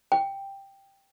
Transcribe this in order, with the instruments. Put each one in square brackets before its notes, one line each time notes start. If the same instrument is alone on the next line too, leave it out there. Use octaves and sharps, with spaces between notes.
[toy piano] G5